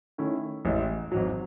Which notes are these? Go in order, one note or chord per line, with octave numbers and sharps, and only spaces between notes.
D#3 A3 C#4 E4
A1 A2 G#3
G#1 G#2 F#3